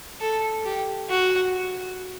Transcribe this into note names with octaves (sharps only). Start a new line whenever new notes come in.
A4
G4
F#4